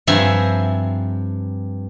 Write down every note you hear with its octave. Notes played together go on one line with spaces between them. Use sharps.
G2 F3 C4 E5 G#5 A#5